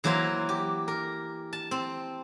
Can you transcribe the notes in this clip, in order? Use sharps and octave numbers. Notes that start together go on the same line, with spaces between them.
E3 F#3 A#3 B4 C5 A#5
G4
A#4
A5
C4